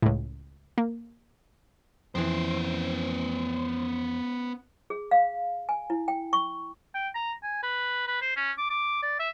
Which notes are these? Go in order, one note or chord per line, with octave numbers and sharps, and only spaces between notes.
C#2 A2
A#3
F2 E3 B3 C5
G#4
F5
G#5
E4
G5
C#6
G5
A#5
G#5
B4
B4
C5
C#4
D6
D6
D5
E5